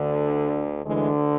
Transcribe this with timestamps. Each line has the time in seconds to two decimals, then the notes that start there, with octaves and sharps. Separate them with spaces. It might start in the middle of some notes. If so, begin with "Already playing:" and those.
Already playing: D2 D3
0.86 D2 D3 E3 G#3